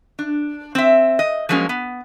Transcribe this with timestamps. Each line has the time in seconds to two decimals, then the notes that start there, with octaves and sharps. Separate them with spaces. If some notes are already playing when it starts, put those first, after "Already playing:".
0.19 D4
0.75 C4 E5
1.19 D#5
1.49 F3 F#3 G#3 A#3 C#4
1.69 B3